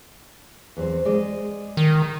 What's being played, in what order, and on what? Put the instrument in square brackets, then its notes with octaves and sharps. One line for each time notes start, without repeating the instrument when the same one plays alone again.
[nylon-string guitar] E2 C4 C5
G#3 D5
[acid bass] D#3